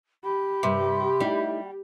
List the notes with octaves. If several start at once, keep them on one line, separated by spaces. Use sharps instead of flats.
G4 B5
G2 C3 G3 A#4
G3 A3 D#4 E4